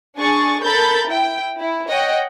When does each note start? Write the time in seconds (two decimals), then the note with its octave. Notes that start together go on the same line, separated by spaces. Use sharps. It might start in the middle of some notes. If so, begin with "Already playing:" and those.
0.17 D4 G#4 C#6 A6
0.63 A4 A#4 B5 G6 A6
1.09 E4 G5
1.59 E4
1.90 C#5 D#5 F#5 G5